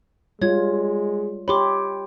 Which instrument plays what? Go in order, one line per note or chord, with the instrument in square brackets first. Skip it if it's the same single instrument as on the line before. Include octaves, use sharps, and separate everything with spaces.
[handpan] G3 F4 [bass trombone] G#3 [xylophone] C#5 G#6
[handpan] G4 C#5 [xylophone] B5 C6 D6